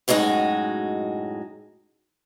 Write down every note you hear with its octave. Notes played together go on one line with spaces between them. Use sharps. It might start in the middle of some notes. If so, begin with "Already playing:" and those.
F#2 A2 G#3 D#4 F#4